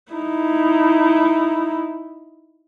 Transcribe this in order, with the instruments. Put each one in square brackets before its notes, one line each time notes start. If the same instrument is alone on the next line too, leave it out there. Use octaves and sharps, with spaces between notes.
[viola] D#4 E4